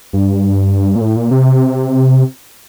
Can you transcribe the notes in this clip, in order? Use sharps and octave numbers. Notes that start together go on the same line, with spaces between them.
G2
A#2
A2
A#2
C3